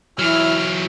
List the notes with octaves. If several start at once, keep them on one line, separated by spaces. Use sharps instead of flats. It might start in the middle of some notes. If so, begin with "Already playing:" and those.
E3 F#3 E4 F6